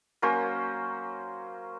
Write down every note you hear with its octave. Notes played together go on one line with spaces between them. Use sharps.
F#3 A#3 C#4 C5